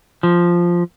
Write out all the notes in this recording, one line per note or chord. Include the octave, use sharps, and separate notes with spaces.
F3